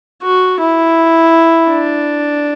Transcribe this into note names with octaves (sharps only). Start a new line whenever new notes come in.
F#4
E4
D4